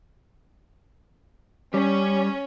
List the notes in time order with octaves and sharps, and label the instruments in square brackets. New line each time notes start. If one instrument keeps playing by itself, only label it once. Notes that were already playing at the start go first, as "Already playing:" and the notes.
[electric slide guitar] G3 [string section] C#4